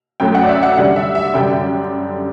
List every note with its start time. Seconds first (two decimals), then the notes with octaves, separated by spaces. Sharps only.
0.20 F#2 F#3 A3 G5
0.35 F#5
0.43 D5
0.49 E5
0.63 F#5
0.78 D3 G3 D4 F#5
0.96 E5
1.15 E5
1.34 F#2 D3 G3 D4 G5